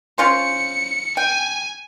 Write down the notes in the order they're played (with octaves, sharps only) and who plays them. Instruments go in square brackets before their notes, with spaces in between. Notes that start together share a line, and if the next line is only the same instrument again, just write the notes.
[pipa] C#4 F4 C5 [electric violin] C#7
[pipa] G5 [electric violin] G#5